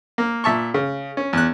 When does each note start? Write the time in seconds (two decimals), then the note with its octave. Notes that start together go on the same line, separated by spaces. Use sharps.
0.18 A#3
0.44 A#2 E5 A5 C#6
0.74 C#3
1.17 C#4
1.33 E2 F#6